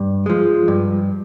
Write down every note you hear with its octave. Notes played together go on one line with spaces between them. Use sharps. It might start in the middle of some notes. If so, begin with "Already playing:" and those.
Already playing: G2
F3 G#3
G2